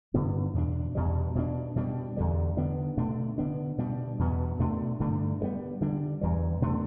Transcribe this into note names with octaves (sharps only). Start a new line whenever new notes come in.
G2 D3 B3 D4
E2 B2 A3 D4
E2 B2 G3
B2 A3 D4
B2 G3 D4
E2 D3 G3
D3 B3 D4
B2 A3 D4
D3 B3 D4
B2 G3 D4
E2 B2 B3
B2 A3 D4
G2 D3 A3 D4
G2 G3 B3
D3 G3 D4
E2 E3 G3
B2 A3 D4